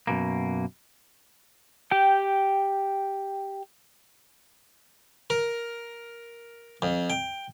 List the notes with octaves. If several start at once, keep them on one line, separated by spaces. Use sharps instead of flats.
F#2 B2 A#3
G4 G5
A#4
F2
G5